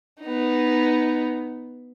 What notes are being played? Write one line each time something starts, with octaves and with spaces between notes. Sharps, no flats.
B3 D#4